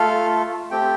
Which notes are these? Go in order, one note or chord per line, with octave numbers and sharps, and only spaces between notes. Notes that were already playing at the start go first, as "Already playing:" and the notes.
Already playing: A3 F4 A4 F5
A3 C4 G4 G5